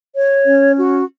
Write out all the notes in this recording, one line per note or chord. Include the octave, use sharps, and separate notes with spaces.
C#5
C#4
F#4